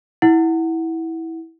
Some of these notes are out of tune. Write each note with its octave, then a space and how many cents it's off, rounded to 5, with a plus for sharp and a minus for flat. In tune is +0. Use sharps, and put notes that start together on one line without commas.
E4 -15 F#5 +0